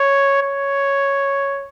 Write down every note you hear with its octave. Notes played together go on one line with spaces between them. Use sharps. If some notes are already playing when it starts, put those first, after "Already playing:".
Already playing: C#5
C#5